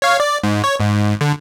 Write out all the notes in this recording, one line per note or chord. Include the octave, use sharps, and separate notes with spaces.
C#5 F5
D5
G#2
C#5
G#2
D3